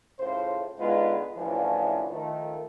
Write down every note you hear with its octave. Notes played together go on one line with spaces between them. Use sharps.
A2 C#3 F4 C5
D3 G#3 B3 D#4 F4 B4
D2 A2 C#3 E3 F3
D#3 F3 A3